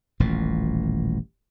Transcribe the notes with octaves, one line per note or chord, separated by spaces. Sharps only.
D#1 A1 A#2